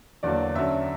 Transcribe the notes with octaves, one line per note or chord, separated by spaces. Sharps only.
E2 D3 F#3 A#3 D5
F#2 D3 F#3 E5